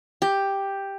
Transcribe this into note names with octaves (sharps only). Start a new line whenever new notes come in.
G4